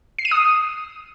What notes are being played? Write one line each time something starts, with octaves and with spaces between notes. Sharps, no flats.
C7
D#7
D#6